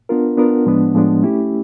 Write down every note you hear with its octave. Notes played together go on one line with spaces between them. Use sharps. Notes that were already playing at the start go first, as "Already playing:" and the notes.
B3 D4 F4 A#4
B3 D4 F4 A#4
A2 F3 G#3 B3 D4
A2 F3 G#3 B3 D4
A3 C#4 E4 G4